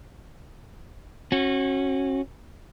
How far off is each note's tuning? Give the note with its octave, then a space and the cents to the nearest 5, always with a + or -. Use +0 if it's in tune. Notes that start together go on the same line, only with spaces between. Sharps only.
C#4 -30 F#4 +0